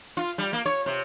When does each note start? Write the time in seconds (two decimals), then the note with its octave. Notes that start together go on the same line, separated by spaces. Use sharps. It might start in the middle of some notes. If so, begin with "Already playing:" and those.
0.17 F4
0.38 G3
0.53 A#3
0.66 C#5
0.86 C3